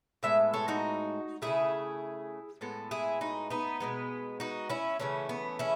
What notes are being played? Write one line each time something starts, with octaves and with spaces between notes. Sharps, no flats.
A2 G#3 B3 E5
A4 C#5
D#4 F#4
C#3 E3 A3 E4 G#4
A2 G#3 B3 A4
E4 G#4
D#4 F#4
B3 D#4
B2 G#3 B3
D#4 F#4
C#4 E4
C#3 E3 A3 C#4
B3
C#4 E4